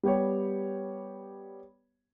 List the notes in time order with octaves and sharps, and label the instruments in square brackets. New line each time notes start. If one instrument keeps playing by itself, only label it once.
[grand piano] G3 B3 G4 C#5